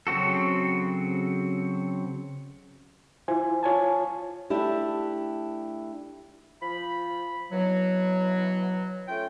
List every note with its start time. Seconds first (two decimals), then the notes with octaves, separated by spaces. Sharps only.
0.07 C#3 F#3 C4 F#4 A4
3.28 E4 F4 C5 G#5
3.63 F4 C#5 G#5 A5
4.50 A3 D4 E4 G4
6.62 F3 B5
7.52 B2 E3 F#3
9.08 A3 C#4 F4 G5